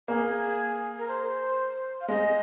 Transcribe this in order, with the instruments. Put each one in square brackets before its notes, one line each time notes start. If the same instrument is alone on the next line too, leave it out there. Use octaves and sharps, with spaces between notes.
[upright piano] A#3 [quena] G#4
[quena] A#4
C5
F5
[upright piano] G#3 [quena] D#5